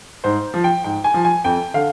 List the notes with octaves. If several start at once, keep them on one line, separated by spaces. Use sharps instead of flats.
G#2 C5
F3
G5
G#2 G5
G#5
F3
G#5
F2 G5
D3 F5